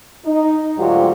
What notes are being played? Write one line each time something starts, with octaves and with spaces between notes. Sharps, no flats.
D#4
D2 G#2 F#3 F4 G4